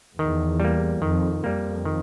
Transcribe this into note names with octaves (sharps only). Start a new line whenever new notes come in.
E2 D#3
G3 A#3
F2 D#3
F2 G3 A#3
D#3